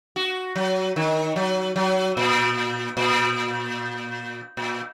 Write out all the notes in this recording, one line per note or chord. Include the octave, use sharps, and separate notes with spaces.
F#4
F#3
D#3
F#3
F#3
A#2
A#2
A#2